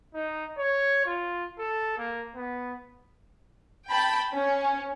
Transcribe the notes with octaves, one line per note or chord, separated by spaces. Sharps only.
D#4
C#5
F4
A4
A#3
B3
G5 A5 B5
C#4